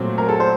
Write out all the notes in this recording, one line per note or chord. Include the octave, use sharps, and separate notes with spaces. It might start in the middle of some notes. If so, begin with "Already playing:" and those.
Already playing: A#2 F#3 A3 C4
A#4
A4
C5